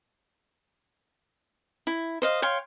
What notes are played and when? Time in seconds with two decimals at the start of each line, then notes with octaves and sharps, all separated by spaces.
1.87 E4
2.22 C5 D#5 F5
2.42 C#5 F5 G5 C6